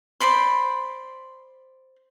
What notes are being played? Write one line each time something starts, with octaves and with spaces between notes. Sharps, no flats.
C5 D5 B5 C6